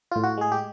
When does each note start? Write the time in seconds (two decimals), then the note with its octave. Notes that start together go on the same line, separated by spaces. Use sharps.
0.12 A2 F4
0.23 F#4
0.37 G#3 G#4
0.52 G4